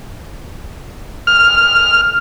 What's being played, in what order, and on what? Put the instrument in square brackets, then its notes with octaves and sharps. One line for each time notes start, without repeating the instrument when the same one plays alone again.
[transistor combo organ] F6